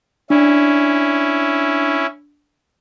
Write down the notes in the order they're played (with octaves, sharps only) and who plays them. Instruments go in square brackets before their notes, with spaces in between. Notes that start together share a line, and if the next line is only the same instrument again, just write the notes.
[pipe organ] C#4 E4 [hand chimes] D4